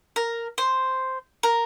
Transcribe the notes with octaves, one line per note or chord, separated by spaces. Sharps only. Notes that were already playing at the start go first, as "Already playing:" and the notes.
A#4
C5
A#4